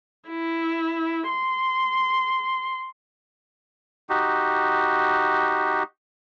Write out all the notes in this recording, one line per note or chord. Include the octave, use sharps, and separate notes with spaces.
E4
C6
D#4 F#4 G4